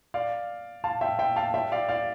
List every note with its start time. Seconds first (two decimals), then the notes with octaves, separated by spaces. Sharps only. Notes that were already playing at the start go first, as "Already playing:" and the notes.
0.14 D5 F5
0.84 F5 A5
1.01 E5 G5
1.19 E5 G5
1.36 F5 A5
1.54 E5 G5
1.72 D5 F5
1.89 D5 F5